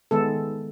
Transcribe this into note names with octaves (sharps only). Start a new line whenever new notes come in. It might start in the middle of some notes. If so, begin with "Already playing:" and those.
D#3 G#3 B3 A4